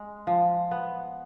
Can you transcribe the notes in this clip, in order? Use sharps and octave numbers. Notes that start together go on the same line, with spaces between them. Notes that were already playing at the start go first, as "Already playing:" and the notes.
Already playing: G#3
F3
B3